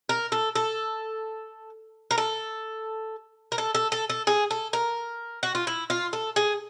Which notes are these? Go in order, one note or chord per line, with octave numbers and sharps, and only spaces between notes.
A#4
A4
A4
A#4
A4
A#4
A4
A4
A4
A4
G#4
A4
A#4
F#4
F4
E4
F4
A4
G#4